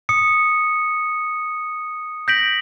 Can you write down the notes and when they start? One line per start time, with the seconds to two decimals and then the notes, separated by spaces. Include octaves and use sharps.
0.09 D#6 C#7
2.28 G6 A#6 B6 D7 F#7